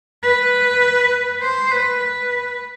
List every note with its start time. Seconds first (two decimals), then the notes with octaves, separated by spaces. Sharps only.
0.23 B4
1.42 C5
1.71 B4
2.01 B4